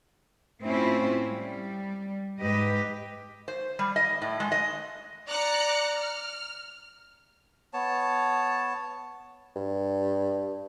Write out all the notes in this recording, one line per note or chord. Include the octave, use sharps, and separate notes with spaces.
A2 C4 C#4 E4 F4
G3
G#2 G4 B4 D#5
C5
G3
D#5
A2
G#3
D#5
D5 A#5 F#6 C#7
F6
B3 C#5 A5
G2